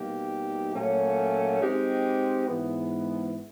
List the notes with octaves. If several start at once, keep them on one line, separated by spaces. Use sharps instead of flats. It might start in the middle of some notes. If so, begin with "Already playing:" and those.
Already playing: B2 G3 A#3 D#4 G4
A#2 F#3 A3 C#4
G#3 C4 D#4 G4
G#2 E3 G#3 B3